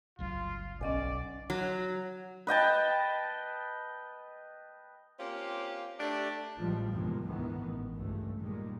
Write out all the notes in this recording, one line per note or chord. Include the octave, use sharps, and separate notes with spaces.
G1 C#2 F#3 F4
B1 C#4 D5 D#5 G#5
F#3
B4 D#5 G5 A5
A#3 C4 C#4 F4 G4 F5
A3 D4 G4
A1 E3 F3 G3 G#3
E2 G2 C3 D#3 F3 G#3
D2 G#2 B2 D#3 E3 B3
A1
C#2 G2 A3
A#2 D#3 G3 G#3